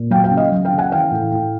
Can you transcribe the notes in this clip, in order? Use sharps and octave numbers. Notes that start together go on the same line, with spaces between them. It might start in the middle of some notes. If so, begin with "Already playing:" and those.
Already playing: A#2
F#3 F5 G5
F5 G5
C#3
D#5 F5
F#3
F5 G5
C#3
F#5 G#5
E3 F5 G5
A2
A2